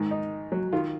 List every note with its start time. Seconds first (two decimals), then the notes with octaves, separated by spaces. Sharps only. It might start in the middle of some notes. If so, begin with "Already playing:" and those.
Already playing: G#2 D#3
0.11 D#4
0.52 F#3
0.73 D#3 F4